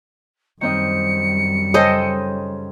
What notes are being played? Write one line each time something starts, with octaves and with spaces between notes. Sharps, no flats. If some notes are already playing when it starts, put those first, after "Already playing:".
F#2 D#3 G3 C4 D#5 C#7
C#3 A4 C5 D#5 G5